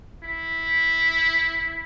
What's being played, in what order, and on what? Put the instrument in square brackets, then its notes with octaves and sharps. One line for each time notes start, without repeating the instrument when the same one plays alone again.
[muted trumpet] E4